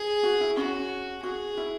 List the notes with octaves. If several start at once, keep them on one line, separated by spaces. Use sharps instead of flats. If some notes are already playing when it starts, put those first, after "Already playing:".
Already playing: G#4
F#4
E4
C#4 F#4
F#4 G#4
E4